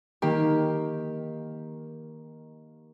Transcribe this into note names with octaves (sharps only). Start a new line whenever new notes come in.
D#3 A#3 G4